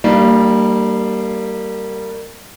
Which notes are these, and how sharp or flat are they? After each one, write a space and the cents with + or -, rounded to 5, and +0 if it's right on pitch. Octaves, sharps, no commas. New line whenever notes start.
G3 -15 A#3 -25 D4 +35